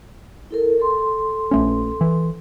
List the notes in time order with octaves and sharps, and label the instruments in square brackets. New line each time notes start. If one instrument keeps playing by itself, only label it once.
[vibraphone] E4 A4 A#4
A4 C6
[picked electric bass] A#1 A3 C#4
E3